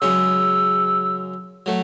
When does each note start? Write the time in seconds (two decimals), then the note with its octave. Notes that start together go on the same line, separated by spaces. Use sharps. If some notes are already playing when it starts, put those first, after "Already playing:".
0.01 F#2 C#3 G#3 C#4 E6
1.66 F#3 A3